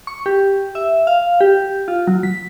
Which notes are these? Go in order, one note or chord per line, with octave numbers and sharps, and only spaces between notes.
C#6
G4
E5
F5
G4
F4
F#3
B6